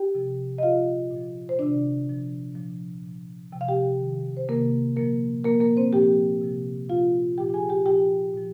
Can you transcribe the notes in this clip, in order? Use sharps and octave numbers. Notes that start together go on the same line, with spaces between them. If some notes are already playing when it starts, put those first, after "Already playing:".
Already playing: G4 G5
C3 F3
D#5
A#2 F3 F4 F5
A#2 F3
C5
C3 D#3 D4 D5
A#2 F3
A#2 F3
A#2 F3
C3 F3 G5
F5
G4 G5
C3 D#3
C5
C3 D#3 A#3 A#4
A#2 F3 A#3 A#4
A#2 F3 A#3 A#4
A#3 A#4
C4 C5
A#2 F3 G4 G5
C3 F3
A#2 F3 F4 F5
A#2 F3 G4 G5
G5
G#4 G#5
G4 G5
A#2 F3 G4 G5
A#2 F3